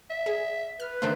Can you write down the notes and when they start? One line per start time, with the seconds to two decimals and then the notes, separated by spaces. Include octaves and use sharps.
0.10 E5
0.26 G#4
0.80 B4 F6
1.02 D3 D#3 A3 C5